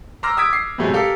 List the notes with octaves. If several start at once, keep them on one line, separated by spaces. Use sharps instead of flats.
A#5 C6 D6 E6 F6 A#6
D#6 E6 G#6 B6 D7
D6 C7
A2 C3 F#3 G#3 A3
G4 A4 A#4 F5